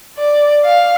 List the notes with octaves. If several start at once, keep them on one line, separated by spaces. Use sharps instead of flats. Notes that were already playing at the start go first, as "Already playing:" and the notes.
D5
F5